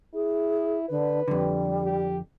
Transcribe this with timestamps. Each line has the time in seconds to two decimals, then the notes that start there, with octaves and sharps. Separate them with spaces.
0.14 E4 G#4
0.89 D3 B4
1.28 F2 D3 G3
1.83 G4